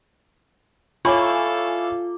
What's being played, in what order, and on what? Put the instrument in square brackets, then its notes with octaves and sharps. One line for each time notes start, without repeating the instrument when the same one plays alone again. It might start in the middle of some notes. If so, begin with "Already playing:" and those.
[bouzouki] E4 [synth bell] F4 D6 [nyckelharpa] A4 F5 [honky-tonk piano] C#5 G#5 C#6